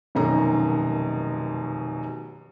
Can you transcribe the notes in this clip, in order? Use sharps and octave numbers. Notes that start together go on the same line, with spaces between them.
F1 F#2 B2 D#3 A#5